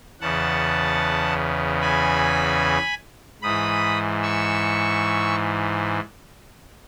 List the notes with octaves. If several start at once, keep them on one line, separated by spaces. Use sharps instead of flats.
E2 C#3 E3 F#5 A5
G#5 B5
G#2 E3 B5 D#6
C#6 E6